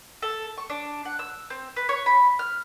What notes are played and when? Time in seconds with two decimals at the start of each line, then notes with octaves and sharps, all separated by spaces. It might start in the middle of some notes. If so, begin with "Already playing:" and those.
0.22 A4
0.58 C#6
0.70 D4
1.05 F#5
1.19 E6
1.50 C4
1.76 B4
1.89 C#5
2.06 B5
2.39 F6